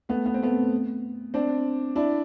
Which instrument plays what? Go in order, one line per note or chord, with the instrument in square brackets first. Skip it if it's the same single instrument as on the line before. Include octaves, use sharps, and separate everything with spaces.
[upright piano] A3 B3
B3
C4
A3 B3
C4 D4
D4 E4